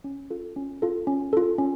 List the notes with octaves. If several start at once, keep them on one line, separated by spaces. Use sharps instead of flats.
C#4
F4 A4
C#4
F4 A4
C#4
F4 A4
C#4